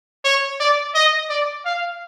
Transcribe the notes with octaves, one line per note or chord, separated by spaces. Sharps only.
C#5
D5
D#5
D5
F5